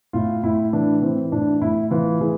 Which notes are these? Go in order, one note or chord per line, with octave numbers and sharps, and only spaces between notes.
A2 F4
A2 E4
E3 D4
E3 C4
A2 D4
A2 E4
E3 F4
E3 G#4